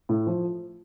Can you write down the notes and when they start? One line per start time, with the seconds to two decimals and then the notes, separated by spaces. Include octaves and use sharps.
0.09 A2
0.27 F3